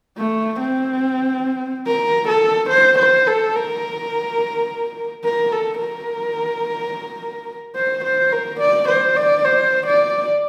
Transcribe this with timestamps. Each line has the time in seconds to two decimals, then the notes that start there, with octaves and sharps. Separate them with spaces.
0.18 A3
0.60 C4
1.87 A#4
2.29 A4
2.70 C5
2.99 C5
3.27 A4
3.56 A#4
5.24 A#4
5.53 A4
5.79 A#4
7.76 C5
8.05 C5
8.33 A#4
8.60 D5
8.89 C5
9.17 D5
9.45 C5
9.87 D5